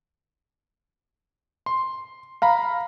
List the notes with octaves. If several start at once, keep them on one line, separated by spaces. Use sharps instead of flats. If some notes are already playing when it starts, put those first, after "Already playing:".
C6
F5 A#5 B5